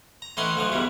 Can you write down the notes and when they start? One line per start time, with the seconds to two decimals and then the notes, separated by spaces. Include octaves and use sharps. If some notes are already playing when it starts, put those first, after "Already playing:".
0.22 A#5
0.37 A2 E3 C#4 D#4 F#5 C6
0.56 D2 F3 F#3 D#4
0.72 E2 G#2 E3 G3